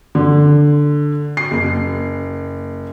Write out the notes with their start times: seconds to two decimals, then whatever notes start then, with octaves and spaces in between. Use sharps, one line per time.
0.15 D3
1.37 C7
1.51 F#1